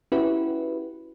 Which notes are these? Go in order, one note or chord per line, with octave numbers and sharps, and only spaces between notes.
C#4 E4 F#4 G4 B4